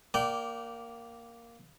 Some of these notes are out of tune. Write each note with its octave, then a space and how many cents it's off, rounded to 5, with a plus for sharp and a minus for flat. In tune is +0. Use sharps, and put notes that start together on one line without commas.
A#3 +0 D5 +0 G5 -30